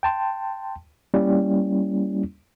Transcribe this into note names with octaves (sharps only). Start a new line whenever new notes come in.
G5 A5 C6
G3 A#3 C#4 E4